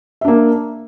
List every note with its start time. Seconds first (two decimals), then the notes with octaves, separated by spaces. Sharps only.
0.21 E5
0.25 D4
0.28 A#3